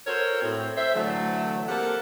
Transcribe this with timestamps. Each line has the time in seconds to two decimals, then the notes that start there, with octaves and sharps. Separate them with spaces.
0.06 F#4 A4 A#4 C5 C#5
0.42 A2 C4
0.77 C5 E5
0.95 D3 E3 F#3 A3
1.69 A#3 C4 G4 A4 A#4 F#5